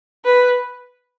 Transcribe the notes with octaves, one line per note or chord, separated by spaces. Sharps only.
B4